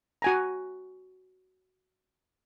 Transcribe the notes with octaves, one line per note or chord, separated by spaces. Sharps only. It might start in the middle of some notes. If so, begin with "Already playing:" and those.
F#4 G#5 A#5